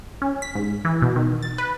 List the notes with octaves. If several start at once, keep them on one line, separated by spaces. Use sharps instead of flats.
C#4
B6
G#2
E3
B2
D#3
A6
B4